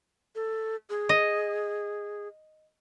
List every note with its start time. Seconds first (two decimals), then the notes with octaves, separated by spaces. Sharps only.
0.36 A4
0.90 G#4
1.09 D#5